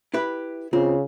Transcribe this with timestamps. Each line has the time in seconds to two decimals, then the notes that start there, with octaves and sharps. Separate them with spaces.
0.14 E4 G4 B4
0.73 C#3 C4 F4